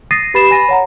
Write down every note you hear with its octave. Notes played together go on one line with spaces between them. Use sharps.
D#6 A6 A#6 C7 D#7
G4 B4 B5 A6 C7 E7
G#5 B5 A#6 D#7
C#5 F#5 A#5